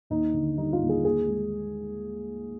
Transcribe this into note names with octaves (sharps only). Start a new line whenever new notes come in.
D#2 D#4
D3
G3 D#4
F4
D#2
G#4
D#2 G#4
G#3